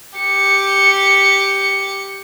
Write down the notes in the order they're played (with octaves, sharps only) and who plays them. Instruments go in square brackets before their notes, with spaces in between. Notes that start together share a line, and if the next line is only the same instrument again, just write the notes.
[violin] G4 C#7